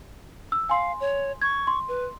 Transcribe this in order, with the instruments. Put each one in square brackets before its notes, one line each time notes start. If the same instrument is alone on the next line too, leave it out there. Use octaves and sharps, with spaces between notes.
[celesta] E6
[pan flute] F5 [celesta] G#5 C6
[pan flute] C#5
[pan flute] C#6 [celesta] G#6
[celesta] C6
[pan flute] B4